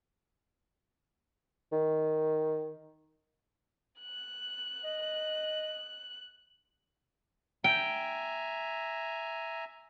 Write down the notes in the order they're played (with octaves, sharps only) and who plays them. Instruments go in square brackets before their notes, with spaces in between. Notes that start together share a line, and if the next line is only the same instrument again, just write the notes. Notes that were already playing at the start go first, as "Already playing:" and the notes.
[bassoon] D#3
[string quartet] F#6
[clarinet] D#5
[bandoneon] E5 G#5 A#5 [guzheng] G5